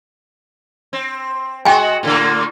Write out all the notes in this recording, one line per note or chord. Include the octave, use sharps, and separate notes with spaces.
C4
G#3 F#4 G5 G#5
A2 D3 A#3